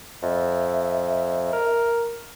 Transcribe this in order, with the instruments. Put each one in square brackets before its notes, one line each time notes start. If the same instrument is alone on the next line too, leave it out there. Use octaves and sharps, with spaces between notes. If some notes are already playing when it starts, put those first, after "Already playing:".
[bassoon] F2 [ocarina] E5
[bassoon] A#4